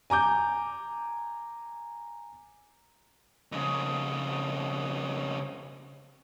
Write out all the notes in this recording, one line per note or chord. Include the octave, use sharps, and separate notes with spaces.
G#5 A#5 D6 G6
F2 C#3